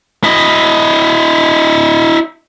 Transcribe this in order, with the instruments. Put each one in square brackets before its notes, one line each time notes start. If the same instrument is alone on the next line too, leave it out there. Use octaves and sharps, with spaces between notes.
[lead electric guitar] E4 D#5